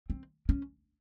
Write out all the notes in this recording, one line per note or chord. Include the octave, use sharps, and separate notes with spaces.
C4
C#4